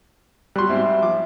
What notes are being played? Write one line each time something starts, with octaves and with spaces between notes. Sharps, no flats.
F#3 G3 C6 C#6 F#6
G#2 C4 E5
F3 D6